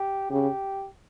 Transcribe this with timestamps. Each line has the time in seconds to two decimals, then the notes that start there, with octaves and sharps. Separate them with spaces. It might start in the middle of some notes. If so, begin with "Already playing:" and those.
Already playing: G4
0.31 C#3 G4